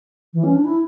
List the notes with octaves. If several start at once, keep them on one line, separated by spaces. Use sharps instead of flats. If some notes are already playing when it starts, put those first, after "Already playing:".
E3
C#4
D4
E4